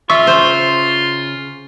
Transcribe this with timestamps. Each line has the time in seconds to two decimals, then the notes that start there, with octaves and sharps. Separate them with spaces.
0.10 C#3 F4 E5 C#6
0.27 C5